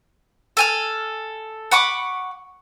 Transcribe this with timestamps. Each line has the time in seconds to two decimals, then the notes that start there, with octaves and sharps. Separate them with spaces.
0.57 A4 G#5 F6
1.71 F#5 B5 C#6 D6